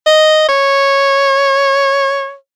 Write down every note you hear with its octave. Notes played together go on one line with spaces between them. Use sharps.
D#5
C#5